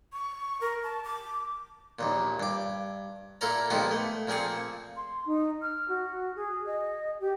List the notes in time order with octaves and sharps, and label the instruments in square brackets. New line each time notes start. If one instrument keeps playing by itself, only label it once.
[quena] C#6
A#4
A5
D6
[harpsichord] A#1 D#2 A#2
G2 D6
A#2 E4 A4 A#4 D5 A#5
A#2 D#3 F3 G#3 B3 G4
A3
A#2 F3 C4 G#4 C#6
[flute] C6
D#4
F6
F#4
G#4
D#5
G4